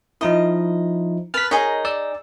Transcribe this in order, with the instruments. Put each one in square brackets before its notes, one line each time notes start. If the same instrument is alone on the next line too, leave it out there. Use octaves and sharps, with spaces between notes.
[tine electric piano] F3 D#4 E4 [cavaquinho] D#5
[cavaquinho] B4 A5 [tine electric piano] F6 B6
[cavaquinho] D#4 G#4 [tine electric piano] A#4 C#5 D#5
[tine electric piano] D5 E6